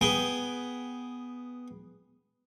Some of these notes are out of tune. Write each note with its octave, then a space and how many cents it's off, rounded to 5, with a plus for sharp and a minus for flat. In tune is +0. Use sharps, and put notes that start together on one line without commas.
B3 +0 G#4 +0 G5 +0